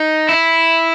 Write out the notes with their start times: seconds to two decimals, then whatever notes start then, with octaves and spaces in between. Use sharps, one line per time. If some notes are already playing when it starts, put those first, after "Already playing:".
Already playing: D#4
0.29 E4